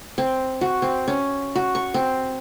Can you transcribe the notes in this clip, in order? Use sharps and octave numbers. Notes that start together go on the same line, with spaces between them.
C4
F#4
C4
C#4
F#4
C#6
C4